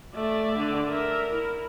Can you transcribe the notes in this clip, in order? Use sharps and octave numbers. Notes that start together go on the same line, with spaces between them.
A3 D5 E5
D3
A#4 E5
E4